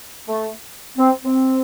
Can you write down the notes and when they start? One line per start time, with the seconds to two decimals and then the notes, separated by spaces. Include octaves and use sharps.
0.26 A3
0.97 C4
1.24 C4